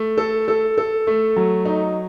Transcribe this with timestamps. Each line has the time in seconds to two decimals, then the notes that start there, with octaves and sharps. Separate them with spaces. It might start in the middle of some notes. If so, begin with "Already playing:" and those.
Already playing: A3
0.18 A4
0.48 A4
0.78 A4
1.07 A3
1.36 F#3
1.65 D#4